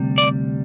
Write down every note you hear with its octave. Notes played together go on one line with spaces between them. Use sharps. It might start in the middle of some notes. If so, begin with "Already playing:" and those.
Already playing: D2 C3 G3
D5